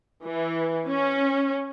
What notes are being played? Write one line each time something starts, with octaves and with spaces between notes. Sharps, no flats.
E3
C#4